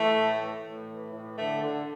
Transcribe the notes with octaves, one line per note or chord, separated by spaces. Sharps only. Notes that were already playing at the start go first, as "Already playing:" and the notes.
Already playing: E3 A3
A2
E3
A2
E3
A2
D3 A3
D3